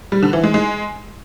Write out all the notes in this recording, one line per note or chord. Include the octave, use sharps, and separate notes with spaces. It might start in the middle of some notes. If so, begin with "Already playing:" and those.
G3
D3
E3
G#3
G#3